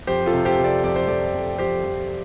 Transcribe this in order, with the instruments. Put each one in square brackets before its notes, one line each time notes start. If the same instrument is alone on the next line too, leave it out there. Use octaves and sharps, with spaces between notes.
[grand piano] F2 G4 C5
F4 A4
C3
G4 C5
C3
A4 D5
F2 D5
C5
F2 A4 D5
F2
F2 G4 C5
F2